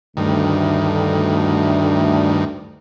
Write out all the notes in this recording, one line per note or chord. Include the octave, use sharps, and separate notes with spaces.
D2 G2 D#3 A3